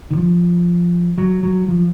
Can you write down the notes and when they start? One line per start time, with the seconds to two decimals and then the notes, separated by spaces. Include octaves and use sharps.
0.11 D#3
0.17 F3
1.18 F#3
1.43 F#3
1.68 F3